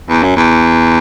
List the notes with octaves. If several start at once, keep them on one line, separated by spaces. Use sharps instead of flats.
E2
F#2
E2